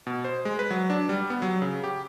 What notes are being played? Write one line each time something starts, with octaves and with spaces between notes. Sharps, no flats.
B2
C5
G#3
B4
F#3
D4
G3
B3
F#3
C#3
G4